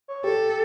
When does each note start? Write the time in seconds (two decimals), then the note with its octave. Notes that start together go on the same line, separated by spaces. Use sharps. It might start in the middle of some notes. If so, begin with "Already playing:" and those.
0.08 C#5
0.24 G4 A4